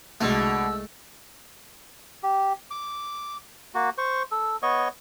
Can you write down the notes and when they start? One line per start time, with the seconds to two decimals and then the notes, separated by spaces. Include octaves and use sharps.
0.21 C2 B2 D3 G#3 A3 E6
2.23 G4
2.71 D6
3.75 A#3 F#4
3.98 C5 C#6
4.31 A4
4.62 B3 C#5 D#5 C#6